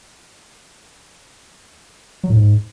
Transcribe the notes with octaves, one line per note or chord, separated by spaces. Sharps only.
F#3
A2
G#2